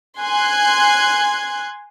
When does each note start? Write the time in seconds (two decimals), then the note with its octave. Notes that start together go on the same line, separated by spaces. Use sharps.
0.20 G#5 C6 F#6 G#6